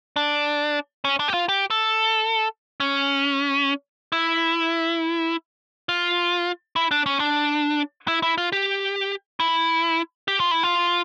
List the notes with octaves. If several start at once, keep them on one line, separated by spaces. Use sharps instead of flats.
D4
C#4
D4
G4
F4
G4
A4
C#4
E4
F4
E4
D4
C#4
D4
E4
E4
F4
G4
E4
G4
F4
E4
F4